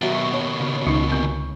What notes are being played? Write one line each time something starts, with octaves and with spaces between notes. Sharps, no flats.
D#2 B2 F#3 E5
C#6
C#5
C#3
C#2 G#3 D#4 C#6
D3 C4